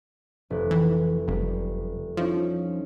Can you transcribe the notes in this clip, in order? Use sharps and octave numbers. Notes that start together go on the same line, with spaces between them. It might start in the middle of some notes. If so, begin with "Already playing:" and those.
F1 B4
E3
F#1 G3
F3 C#4 D#4 E4